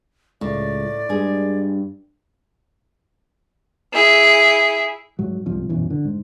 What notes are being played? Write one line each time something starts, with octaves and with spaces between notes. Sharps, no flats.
C#2 A2 D5
G2 G#3 G#4
E4 G#4
G#2 F#3
C2 G#2 C3 F3
D#1 B1 F#2 E3
D3
G#2